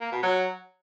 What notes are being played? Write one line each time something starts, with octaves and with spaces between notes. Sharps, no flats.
A#3
B2
F#3